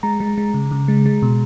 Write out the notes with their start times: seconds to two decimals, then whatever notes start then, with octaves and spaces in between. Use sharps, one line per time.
0.03 G#3 A#5
0.20 G#3
0.38 G#3
0.54 C#3
0.71 C#3
0.88 G#3
1.06 G#3
1.22 B2